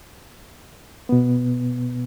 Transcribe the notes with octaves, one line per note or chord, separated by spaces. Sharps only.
B2 B3